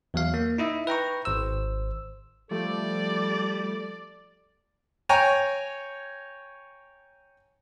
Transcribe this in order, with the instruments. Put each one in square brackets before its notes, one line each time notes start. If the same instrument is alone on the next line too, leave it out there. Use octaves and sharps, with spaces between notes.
[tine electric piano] E2 F#3 F5
A#3
D#4 E4 D#5 E5
B4 G5 A#5 C#6
G#1 C5 E6
[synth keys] F3 A3 [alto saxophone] G3 [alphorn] A4 [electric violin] D5
[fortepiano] C#5 G5 G#5 A#5